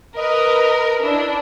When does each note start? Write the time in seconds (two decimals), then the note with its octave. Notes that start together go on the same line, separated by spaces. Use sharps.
0.16 A#4 B4 D#5
1.01 D4 E4